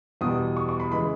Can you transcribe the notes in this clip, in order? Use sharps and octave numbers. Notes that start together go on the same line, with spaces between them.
E2 B2 G3 D#6
C#6
C#6
B5
C#3 E3 G#3 B5